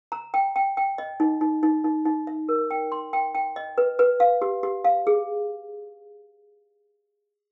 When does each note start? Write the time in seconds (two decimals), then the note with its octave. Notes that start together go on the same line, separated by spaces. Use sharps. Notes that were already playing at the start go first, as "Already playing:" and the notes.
0.12 A#5
0.34 G5
0.56 G5
0.77 G5
0.98 D#5
1.20 D#4
1.41 D#4
1.63 D#4
1.84 D#4
2.05 D#4
2.27 E5
2.49 A#4
2.71 G5
2.92 C6
3.13 G5
3.35 G5
3.56 D#5
3.78 B4
3.99 B4
4.20 F5
4.42 G4
4.63 G4
4.84 F5
5.07 G#4